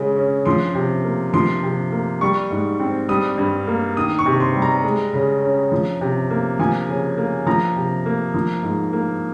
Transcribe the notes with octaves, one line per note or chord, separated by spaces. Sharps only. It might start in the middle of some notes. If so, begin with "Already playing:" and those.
Already playing: C#3 G#3
C#4
F3 C6
C3
A#3
F3 C6
C3
A#3
G3 C#6
G#2
C4
G3 D#6
G2
A#3
D#3 D#6
C#6
C3
C6
G3
A#5
G#3
C#3
C#4
F3
C3
A#3
F3 G#5
C#3
A#3
F3 A#5
C3
A#3
F3
G#2
A#3